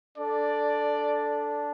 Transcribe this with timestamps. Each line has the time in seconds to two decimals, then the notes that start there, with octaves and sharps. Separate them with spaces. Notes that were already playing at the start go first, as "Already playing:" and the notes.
0.17 D4 A4 D5